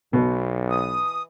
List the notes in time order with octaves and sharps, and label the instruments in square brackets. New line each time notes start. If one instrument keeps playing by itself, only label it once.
[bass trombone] B1 [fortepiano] B2
[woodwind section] E3 D#6